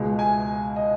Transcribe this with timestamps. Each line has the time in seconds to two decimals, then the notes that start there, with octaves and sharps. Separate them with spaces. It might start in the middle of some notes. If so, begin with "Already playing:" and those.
Already playing: C#2 B2 G#3
0.19 G#5
0.76 D#5